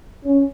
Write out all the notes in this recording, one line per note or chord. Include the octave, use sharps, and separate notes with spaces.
C#4